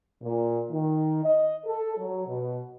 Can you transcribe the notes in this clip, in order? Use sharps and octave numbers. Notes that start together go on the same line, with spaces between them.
A#2
D#3
D#5
A4
F#3
B2